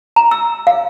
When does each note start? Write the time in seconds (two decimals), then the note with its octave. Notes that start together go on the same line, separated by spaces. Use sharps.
0.16 A#5
0.31 E6
0.67 F5